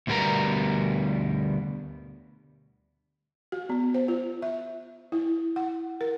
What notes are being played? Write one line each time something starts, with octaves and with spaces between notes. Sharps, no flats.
D2 B2 G3 B3 A#4 A#5
F#4
B3
C5
F4
E5
E4
F#5
A#4